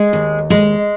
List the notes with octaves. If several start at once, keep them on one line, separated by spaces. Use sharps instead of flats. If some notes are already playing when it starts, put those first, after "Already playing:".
Already playing: G#3
D#2
G#3